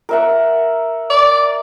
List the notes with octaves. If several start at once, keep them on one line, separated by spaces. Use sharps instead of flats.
A#4 E5 F#5
D5